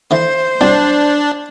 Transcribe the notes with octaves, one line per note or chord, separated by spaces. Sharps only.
D3 E3 C5
C2 F#3 C4 D4